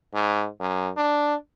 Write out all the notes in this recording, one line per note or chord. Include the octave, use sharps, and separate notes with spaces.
G#2
F#2
D4